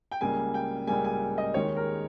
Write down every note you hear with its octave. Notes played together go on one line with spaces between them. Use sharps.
G5
C#2 C#3 G3 A#3 G#5
G5
C#2 C#3 G3 A#3 G#5
G#5
D#5
D#2 D#3 G#3 C#5
A#4